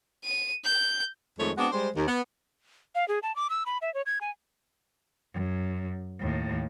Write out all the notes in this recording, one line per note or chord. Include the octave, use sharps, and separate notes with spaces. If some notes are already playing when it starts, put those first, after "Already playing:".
D#7
G6
F2 D#3 G#3 A3 C#5
G#3 B3 C4 D4 F#4
G3 G#3 C5
D#2
B3
F5
G#4
A5
D6
E6
B5
E5
C#5
G#6
G#5
F#2
D#2 A2